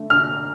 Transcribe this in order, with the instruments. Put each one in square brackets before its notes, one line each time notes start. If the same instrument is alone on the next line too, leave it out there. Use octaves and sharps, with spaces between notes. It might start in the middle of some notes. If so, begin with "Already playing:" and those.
Already playing: [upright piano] D3 A3
D3 F6